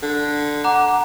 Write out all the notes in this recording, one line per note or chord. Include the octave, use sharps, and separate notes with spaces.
D3
F#5 A#5 D6 F#6